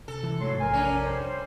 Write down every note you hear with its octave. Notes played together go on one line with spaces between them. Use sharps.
C3 A4
E3
G#2 F#3 A3 C6
F1 A#1 A#4 G#5
C#4 D4
G3 C5